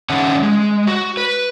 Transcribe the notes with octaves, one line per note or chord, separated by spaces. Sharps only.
D#3 C#4 E5 F#5 A5
G#3
F#4
B4